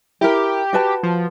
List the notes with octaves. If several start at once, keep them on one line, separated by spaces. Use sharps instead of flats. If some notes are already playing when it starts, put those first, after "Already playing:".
E4 G4 A#4
F#4 B4 A5
F3